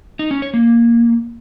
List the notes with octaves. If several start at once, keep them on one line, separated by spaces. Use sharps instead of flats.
D#4
C#4
C#5
A#3